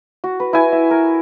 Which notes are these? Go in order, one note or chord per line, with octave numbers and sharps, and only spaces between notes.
F#4
B4
E4 G#5
E5
A#4